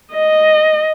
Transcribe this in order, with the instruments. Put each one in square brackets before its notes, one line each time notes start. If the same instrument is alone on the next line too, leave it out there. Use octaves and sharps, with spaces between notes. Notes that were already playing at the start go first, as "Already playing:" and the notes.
[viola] D#5